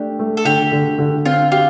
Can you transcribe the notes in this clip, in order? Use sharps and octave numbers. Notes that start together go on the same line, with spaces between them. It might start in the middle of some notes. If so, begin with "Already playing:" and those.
Already playing: A3 D4 G4
A3
A4
D3 G4
D3
D3
C4 F4
F4 G4